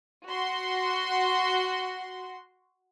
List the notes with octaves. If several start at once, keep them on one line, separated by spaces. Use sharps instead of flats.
F#4 C6